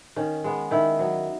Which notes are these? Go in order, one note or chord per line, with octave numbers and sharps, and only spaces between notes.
D#3 C#4
G#3 B3
D#3 E4
F#3 B3